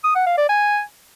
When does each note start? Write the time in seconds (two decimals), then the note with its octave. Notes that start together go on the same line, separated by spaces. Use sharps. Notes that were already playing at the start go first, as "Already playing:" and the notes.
0.04 D#6
0.15 F#5
0.27 F5
0.38 D5
0.49 G#5